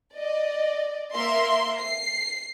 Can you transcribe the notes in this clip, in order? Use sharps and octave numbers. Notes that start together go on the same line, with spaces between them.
D5 D#5
A#3 A#4 E5 C6
C7